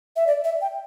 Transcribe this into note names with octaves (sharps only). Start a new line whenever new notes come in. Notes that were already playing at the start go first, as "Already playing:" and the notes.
E5
D5
E5
G5